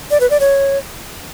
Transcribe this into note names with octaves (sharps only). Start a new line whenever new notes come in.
D5
B4
D5
C#5